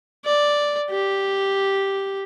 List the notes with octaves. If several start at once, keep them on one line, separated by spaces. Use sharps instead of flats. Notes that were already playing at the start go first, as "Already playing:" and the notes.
D5
G4